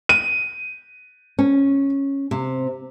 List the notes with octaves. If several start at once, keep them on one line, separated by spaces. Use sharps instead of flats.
D#7
C#4
C3